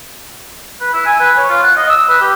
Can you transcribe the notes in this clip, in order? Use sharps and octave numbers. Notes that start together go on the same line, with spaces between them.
B4
E4
G#5
B4
C#5
F4
F#5
D#5
E6
B4
G4